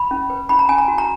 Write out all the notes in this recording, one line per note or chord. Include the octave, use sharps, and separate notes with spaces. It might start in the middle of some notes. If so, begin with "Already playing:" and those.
Already playing: B5
C#4
B4
C#4 B5
A#5
C#4 G#5
A#5
F#4
A#5